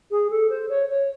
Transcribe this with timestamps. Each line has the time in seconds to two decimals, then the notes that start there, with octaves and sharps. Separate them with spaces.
0.11 G#4
0.30 A4
0.49 C5
0.69 C#5
0.89 C#5